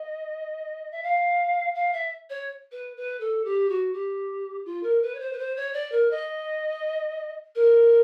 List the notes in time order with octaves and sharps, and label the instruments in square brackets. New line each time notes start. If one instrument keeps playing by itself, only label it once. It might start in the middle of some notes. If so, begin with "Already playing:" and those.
Already playing: [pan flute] D#5
E5
F5
F5
E5
C#5
B4
B4
A4
G4
F#4
G4
F4
A#4
B4
C#5
C5
B4
C5
C#5
D5
A#4
D#5
A#4